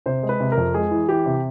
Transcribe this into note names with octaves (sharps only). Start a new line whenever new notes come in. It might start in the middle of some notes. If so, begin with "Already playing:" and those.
C3 C5
G#3
B4
C3
A#4
F2
G#3 G#4
E3
E3 G4
C3